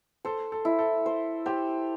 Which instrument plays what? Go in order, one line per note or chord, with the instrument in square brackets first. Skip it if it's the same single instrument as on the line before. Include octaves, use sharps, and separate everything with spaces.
[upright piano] A4 [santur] C5
[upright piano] A4
[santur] E4
[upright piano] A4
[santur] C5
[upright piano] G4 [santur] C5